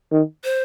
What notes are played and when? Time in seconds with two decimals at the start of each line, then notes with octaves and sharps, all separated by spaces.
0.12 D#3
0.44 C5